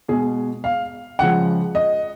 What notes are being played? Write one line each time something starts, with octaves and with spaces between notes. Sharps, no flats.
B2 G#3 G#4
F5
C#3 F3 G#3 F#5
D#5